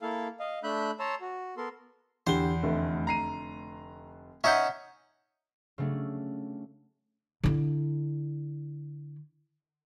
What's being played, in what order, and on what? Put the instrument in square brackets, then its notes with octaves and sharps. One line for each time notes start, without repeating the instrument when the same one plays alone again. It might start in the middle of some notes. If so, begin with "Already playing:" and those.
[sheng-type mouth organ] A#3 E4 A4 F5
D#5 F5
A3 D4 E5 B5 F#6 G6
C#5 A5 A#5 C6 E6
F#4
B3 A4 A#4 C6
[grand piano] E2 G7 [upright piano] D3 G4 [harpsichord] C5
[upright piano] F1 D3 A3
[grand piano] A#5 C7 D#7
[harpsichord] C#4 D#4 F#5 [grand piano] E5 G6
[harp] C#3 F#3 A3 D4
[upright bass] D3 E4